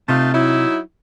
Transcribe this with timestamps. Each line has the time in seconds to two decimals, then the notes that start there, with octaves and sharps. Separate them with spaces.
0.09 C3 A3 D#4 F4
0.33 F#3 D#4 E4